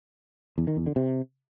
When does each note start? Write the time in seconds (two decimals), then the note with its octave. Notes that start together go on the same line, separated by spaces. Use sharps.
0.58 E2
0.67 D#3
0.77 E2
0.86 D3
0.96 C3